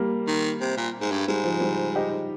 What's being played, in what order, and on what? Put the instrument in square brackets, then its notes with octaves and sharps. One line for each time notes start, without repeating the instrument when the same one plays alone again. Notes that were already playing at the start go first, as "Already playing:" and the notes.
Already playing: [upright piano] G3 A#3
[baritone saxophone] D#3
C3
A#2
G#2
G2
[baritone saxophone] G#2 [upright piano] G3
[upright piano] F3
G3
D#4 G4